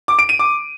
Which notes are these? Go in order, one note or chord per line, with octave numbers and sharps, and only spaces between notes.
D6
D7
D#7
D6